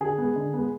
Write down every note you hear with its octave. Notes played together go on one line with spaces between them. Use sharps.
D3 G#4
G#3 B3
D3
G#3 B3